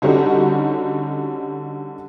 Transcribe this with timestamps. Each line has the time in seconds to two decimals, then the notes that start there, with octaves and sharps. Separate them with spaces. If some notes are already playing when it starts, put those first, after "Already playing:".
0.02 D3 G3 C#4 D#4 F#4 G4